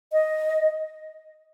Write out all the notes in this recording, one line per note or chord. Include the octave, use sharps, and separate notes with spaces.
D#5